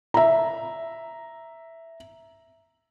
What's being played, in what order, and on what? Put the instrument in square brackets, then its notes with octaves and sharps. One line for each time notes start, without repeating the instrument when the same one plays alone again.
[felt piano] E5 A#5